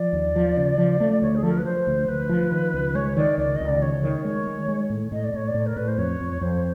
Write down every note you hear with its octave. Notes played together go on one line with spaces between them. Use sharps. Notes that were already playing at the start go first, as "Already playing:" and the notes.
Already playing: F3 D5
D#2
F3
C#3
F3
A3
D2 C#5
G#4
F3 A4
A#4
B4
F3 C5
D2
D2 B4
F3
D#3
C#2
G#3 C#5
D#3 D5
C#2 D5
C#2 D#5
D5
D#3 C#5
D#3 C#5
G#3 C#5
G#3
G#3
A2
A2 D#5
D5
A2 C#5
D5
A2
A#4
A2 B4
C5
F2 C#5
F2
F2 C5